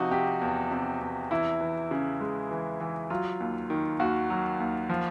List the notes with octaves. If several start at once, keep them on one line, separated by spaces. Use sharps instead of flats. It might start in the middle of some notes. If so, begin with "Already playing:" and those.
Already playing: C3 F3 D#4 F#4
C3 G4
E2
C3
E2
E3 E4
E3
C#3
G#3
E3
E3
F#3 F4
D#2
D#3
D#2 F#4
F#3
D#2
F3